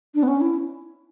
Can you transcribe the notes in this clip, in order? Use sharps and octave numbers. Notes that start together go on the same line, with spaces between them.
D4
B3
C#4
E4